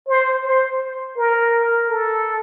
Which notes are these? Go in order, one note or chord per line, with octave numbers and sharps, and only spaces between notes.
C5
C5
A#4
A4